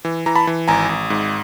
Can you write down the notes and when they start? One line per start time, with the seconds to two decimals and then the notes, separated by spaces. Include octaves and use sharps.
0.05 E3
0.26 E3 A#5
0.36 A5 B5
0.47 E3
0.68 G#1 G#5 A#5
0.89 G#1
1.10 G#2